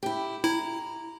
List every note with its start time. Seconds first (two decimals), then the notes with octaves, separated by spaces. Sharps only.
0.03 E4 G4
0.44 E4 A#5